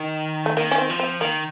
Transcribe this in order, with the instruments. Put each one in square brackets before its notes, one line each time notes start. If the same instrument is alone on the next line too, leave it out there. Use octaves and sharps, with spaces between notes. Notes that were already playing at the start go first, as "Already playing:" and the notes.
Already playing: [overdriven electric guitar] D#3
[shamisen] A3
[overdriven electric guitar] D#3 [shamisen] A#3
[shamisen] C#4
C4
[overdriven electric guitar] F3
[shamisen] C4
[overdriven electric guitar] D#3 [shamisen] A#3